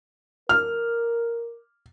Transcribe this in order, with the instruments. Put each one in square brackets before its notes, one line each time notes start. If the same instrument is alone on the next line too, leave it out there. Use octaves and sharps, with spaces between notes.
[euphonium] A#4 [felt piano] F6